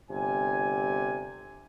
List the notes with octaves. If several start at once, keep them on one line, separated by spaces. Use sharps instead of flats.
G1 C3 G#5